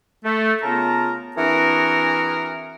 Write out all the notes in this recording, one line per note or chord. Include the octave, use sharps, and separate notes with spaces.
A3
C#3 B3 F4 A#4 A5 A#5
E3 C4 D4 F#4 G#4 A#4